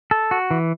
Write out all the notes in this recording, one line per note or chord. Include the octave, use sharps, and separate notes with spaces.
A4
F#4
E3